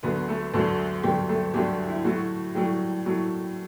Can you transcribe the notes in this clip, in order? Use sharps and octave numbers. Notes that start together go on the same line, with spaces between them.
D2 D3 F#3 B3 B4
A3 A4
D2 D3 F#3 A3 A4
D2 D3 F#3 G3 G4
A3 A4
D2 D3 F#3 G3 G4
E4
A2 F#3 A3 F#4
A2 F#3 G3 A3 G4
A2 F#3 A3